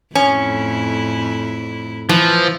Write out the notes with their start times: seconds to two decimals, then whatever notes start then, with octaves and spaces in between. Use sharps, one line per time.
0.15 F2 A2 C#4 E4
2.09 E3 F3